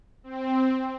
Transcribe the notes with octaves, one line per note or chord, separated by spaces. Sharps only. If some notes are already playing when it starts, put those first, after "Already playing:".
C4